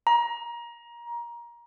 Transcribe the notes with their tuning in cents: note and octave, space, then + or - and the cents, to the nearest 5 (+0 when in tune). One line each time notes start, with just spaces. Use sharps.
A#5 +20